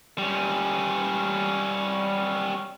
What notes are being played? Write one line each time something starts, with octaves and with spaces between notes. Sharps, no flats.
G3 C#4